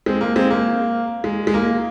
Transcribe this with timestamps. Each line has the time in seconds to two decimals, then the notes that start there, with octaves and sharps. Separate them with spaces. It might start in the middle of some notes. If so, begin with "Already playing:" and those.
0.06 G#3 C4
0.21 A#3
0.36 G#3 C4
0.50 A#3
1.24 G#3
1.47 G#3
1.54 A#3